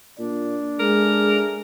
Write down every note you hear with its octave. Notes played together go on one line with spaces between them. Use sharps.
A#2 D4
G#3 A3 G#4 A#4